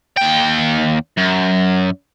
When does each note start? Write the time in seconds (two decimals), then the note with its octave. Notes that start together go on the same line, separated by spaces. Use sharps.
0.17 D#2 G5
1.17 F#2